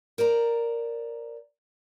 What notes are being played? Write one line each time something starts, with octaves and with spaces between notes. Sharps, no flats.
A#4 C5 D5 A#5